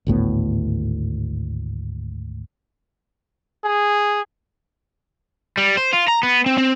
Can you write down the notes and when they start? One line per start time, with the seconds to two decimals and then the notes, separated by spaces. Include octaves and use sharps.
0.07 G#1 D2 A2 B3
3.64 G#4
5.57 G3
5.77 C5
5.93 F4
6.08 A#5
6.23 B3
6.46 C4
6.58 C4